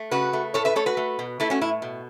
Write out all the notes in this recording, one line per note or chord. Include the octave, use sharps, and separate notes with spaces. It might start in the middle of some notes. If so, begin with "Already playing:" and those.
Already playing: A3
C#3 F#4 B4
A3
A2 A4 C#5
B4 E5
A3 A4 C#5
F#4 B4
A3
B2
A3 E4 A4
C#4 F#4
A2 E4
B2